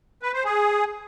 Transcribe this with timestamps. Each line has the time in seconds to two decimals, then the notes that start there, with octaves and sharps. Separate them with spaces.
0.22 B4
0.33 C5
0.44 G#4